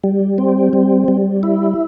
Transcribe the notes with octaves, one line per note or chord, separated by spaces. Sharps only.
G3
C4
G3
G3
E4